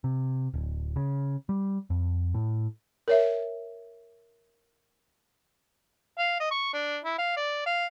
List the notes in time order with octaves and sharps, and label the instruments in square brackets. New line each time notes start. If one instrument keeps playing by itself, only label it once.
[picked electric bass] C3
D1
C#3
G3
F2
A2
[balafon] A#4 C#5 E5
[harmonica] F5
D#5
C#6
D4
E4
F5
D5
F5